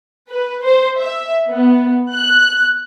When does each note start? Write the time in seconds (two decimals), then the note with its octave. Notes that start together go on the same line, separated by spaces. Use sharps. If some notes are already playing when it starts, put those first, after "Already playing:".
0.28 B4
0.64 C5
0.98 E5
1.50 B3
2.14 F#6